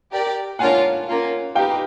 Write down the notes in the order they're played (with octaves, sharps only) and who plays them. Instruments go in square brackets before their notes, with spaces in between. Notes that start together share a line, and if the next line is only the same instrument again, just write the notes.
[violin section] G4 A#4 D5
[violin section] D4 F4 A#4 C#5 F5 [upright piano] F#5 G#5
[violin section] A#3 C#4 F4
[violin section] D#4 G4 B4 [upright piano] F5 G5